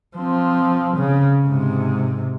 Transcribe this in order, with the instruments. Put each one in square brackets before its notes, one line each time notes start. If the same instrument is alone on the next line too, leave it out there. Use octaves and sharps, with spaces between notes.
[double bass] F3 C4
C#3
G#2 C3